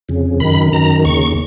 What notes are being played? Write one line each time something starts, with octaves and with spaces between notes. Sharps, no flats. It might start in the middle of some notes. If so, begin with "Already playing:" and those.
F2 C#3
F#2 D#3 B5
F#2 D#3 A#5
D#2 C#3 C#6